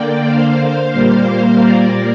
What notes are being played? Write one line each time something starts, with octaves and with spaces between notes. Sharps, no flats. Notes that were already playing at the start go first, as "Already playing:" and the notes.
Already playing: D3 A#3 D5 G5
C5 F5
A#2 G3 A#3
A#4 D5